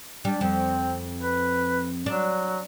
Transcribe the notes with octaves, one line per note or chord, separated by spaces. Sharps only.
G3 D4
F2 C4
B4
F#3 D4